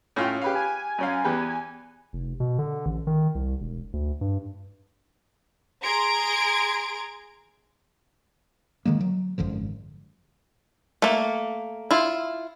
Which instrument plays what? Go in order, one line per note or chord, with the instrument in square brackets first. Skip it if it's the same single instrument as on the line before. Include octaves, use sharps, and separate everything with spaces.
[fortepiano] A2 F4 G5 [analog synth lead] C#4
[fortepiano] G4 B4 F5
[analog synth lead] G#5
[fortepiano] F#2 C#4 F5
E2 G4 B4
[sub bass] F1
B2
D3
A1
D#3
C2
E1
D2
G2
[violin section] G#4 A#5 C6 G#6 D7
[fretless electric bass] D3 D#3 G#3 A#3
F#3
G#1 F#2 D3 F3
[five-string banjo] A3 A#3
E4 F4